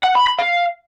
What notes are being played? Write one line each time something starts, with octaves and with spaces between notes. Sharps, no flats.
F#5
B5
B5
F5